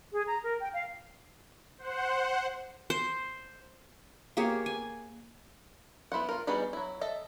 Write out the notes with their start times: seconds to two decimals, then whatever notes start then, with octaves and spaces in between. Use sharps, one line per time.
0.12 G#4
0.26 A#5
0.43 A#4
0.59 G5
0.72 F5
1.78 C5 F#5
2.90 C5
4.37 A#3 G4 G#4 C#5
4.66 G#5
6.12 B3 E4 C5 F#5
6.29 F4 A#4
6.47 G3 B3 D#4 F#4 G#4
6.73 F#3 E4
7.01 A4 D#5 E5